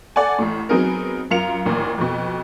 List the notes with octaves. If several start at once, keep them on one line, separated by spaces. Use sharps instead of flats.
A4 D5 F#5 G#5
A1 A2
F#3 B3 C4 D#4 G#4 A#4
F#2 F4 A#4 C#7 F7
A1 D#2 A#2
F2 B2